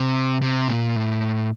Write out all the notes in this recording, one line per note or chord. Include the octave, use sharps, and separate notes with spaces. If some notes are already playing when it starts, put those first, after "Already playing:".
Already playing: C3
C3
A#2
A2